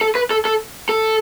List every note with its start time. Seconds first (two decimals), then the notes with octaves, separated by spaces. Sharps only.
0.01 A4
0.15 B4
0.31 A4
0.45 A4
0.89 A4